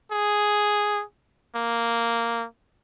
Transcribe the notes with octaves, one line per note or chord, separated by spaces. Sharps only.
G#4
A#3